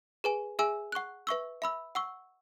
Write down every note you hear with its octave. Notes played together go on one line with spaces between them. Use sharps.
G#4 B4 G#5
G#4 E5 G#5 E6
F#5 C#6 F#6
B4 E5 C#6 E6
E5 B5 E6
F#5 C#6 E6